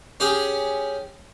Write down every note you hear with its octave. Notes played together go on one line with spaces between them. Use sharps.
C#4 G4 G#4